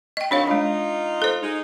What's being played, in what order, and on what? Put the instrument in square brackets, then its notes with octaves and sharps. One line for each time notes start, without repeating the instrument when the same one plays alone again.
[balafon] D#5 G5
[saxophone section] D#3 F#3 C4 [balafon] D4 C#5 F5
[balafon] G#3 D4 [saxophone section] D#4 F4
[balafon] A4 C5
[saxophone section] G#3 D#4